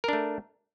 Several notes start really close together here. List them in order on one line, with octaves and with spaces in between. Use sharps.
A#4 D4 A3